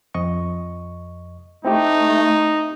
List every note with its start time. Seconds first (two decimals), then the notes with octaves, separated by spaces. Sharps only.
0.14 F2 D#5 C#6
1.65 A3 C4 D#4 E4 G4